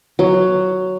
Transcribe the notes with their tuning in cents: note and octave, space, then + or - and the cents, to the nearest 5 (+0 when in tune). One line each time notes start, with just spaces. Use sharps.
F#3 +5